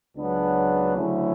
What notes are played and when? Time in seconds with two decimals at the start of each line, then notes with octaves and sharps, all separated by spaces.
0.16 C#2 C#3 F#3 B3 D4
0.96 D2 C#3 F#3 C#4 E4